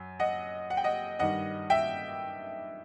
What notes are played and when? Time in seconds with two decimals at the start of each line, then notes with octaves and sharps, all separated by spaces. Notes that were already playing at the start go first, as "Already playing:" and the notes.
Already playing: F#2
0.20 D#5 F#5
0.70 F#5
0.77 G5
0.84 D#5 F#5
1.19 G2 D#3 G3 D#5 F#5
1.70 E5 G5